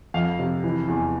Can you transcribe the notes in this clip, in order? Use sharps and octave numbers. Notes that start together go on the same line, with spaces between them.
F2 F5
C3
E3
E2